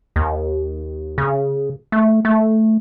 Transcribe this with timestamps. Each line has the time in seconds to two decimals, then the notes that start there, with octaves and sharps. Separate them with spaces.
0.16 D#2
1.18 C#3
1.92 A3
2.25 A3